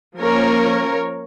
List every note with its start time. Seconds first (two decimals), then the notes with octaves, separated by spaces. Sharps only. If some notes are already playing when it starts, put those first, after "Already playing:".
0.18 F3 A#3 C#4 A#4 C#5